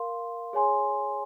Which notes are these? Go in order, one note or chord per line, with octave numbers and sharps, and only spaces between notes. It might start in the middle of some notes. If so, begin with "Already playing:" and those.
Already playing: A#4 F5 C6
G#4 C#5 G#5 C6